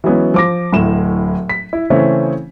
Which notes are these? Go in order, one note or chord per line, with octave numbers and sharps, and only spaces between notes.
E3 F#3 G#3 B3 C#4
F3 D6 A#6
D1 A2 E7
B6
E4
C#3 E3 A3 C4 C#4